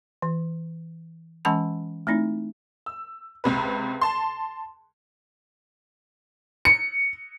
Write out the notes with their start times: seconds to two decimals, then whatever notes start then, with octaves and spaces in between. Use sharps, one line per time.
0.22 E3
1.45 E3 G#3 C#4 F#5 A5 B5
2.07 A3 C4 D#4 E4
2.86 E6
3.44 C#2 C3 B4
4.01 A5 C6
6.65 C#7